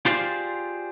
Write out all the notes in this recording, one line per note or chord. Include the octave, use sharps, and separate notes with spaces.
F4 G4 G#4 C5 D5 F5